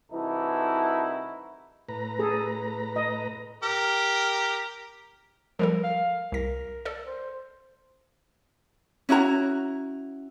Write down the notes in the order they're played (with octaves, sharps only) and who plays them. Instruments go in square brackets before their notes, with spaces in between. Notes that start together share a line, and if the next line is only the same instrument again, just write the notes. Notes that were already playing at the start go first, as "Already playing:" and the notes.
[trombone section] C2 E3 D#4 E4 F#4 A4
[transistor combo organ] A2 B4 A#5
[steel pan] G#4 A4
D#5
[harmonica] G4 A#4
[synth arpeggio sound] F3 G3 A4 [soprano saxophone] A#4
[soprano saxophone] F5
[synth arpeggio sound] C2 A#6 [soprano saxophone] A#4
[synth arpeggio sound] A4 D5
[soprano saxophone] C5
[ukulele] C#4 E4 F#4 A#5